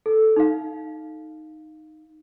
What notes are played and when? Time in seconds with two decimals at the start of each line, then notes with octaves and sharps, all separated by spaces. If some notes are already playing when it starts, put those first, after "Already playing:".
0.06 A4
0.36 D#4 F5